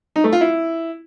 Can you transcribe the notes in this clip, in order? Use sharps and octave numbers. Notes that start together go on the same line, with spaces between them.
D#4
A3
F4
E4